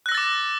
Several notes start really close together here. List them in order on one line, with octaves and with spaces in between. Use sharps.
F#6 A#6 E6 A6 D6